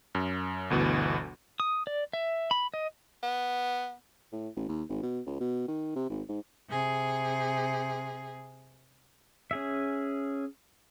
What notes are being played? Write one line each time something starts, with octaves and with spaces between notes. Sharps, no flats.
F#2
G1 D2 B2 E3
D#6
D5
E5
B5
D#5
B3
A2
A1
D#2
G#1
B2
C#2
B2
D#3
C3
G#1
G#2
C3 G#4
C#4 G#4 E5